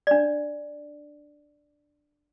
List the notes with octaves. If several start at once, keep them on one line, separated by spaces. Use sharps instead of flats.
D4 D5